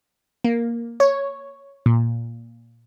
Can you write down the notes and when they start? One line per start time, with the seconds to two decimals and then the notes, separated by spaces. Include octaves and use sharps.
0.44 A#3
1.00 C#5
1.86 A#2